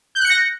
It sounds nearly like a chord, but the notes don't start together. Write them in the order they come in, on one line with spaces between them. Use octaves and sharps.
G6 F#6 C#7 A#6